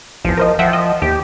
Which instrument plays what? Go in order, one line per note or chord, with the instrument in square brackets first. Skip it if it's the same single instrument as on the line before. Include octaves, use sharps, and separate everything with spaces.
[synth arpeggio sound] A1 E2 [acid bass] F3
[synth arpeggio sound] A#4 C5 D#5
[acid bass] F3 [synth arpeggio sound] E5 F#5 G5
[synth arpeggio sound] D#5
[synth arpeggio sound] D#2 [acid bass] G4